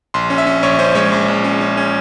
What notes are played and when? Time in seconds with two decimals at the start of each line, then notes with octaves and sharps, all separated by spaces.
0.14 A#1 C6
0.30 C#4
0.38 E5
0.47 C#4
0.63 A#1 C#5
0.79 C#4 C5
0.95 G#3 C#5
1.12 A#1
1.28 A#1
1.44 C#4
1.61 C#4
1.77 C#4